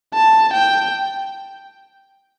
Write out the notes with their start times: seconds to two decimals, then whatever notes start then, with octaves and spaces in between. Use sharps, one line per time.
0.14 A5
0.53 G5